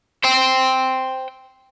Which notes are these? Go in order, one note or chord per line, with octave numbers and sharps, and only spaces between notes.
C5 G5